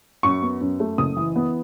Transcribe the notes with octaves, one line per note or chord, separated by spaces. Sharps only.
F#2 C#6
B3
F#2
A3
F#1 D#6
E3
B3